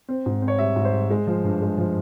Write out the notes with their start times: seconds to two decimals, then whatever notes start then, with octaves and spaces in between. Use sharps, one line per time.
0.08 C4
0.26 G#2
0.42 C4
0.48 C#5
0.58 G3 E5
0.76 G#2
0.85 C5
0.93 G3
1.10 G#3
1.27 F3
1.44 G2
1.61 G#3
1.78 F3